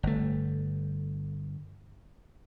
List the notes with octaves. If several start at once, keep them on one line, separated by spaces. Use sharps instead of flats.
G1 A3